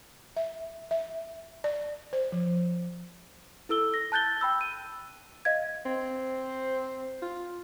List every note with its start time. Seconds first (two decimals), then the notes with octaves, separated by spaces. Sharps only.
0.37 E5
0.91 E5
1.64 D5
2.13 C5
2.32 F3
3.69 E4 A4 E6 G7
3.94 A#6
4.12 A5 F#6 G6 A6 G7
4.41 G5 B5 E6
4.61 D#7
5.45 D#5 F5 G#6
5.86 C4
7.22 F4